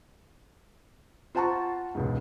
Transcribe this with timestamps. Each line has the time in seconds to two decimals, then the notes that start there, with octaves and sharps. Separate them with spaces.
1.35 F4 C5 F#5 A5 A#5 C#6
1.95 E1 C#2 G#2